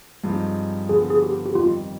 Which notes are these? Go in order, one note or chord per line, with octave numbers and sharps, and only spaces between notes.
G2 F3 G#3 C4 D#4
D3 F3 B3 G#4
G#4
G4
G4
F2 D#3 G3 F4